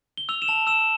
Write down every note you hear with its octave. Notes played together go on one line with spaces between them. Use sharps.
G7
E6 F7
E7
A5 F7
E6 E7